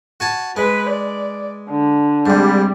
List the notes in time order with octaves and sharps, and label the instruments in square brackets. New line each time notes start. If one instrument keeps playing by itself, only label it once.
[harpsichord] F#4 G#5 A5
[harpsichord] G#3 [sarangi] B4
[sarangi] D5
D3
[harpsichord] G#2 C3 [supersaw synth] G3